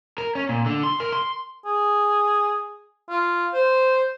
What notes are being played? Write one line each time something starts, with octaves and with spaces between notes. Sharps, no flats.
A#4
C#4
A#2
D3
C6
A#4
C6
G#4
F4
C5